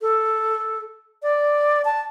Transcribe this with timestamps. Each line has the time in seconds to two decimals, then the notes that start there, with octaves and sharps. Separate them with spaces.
0.01 A4
1.23 D5
1.85 A5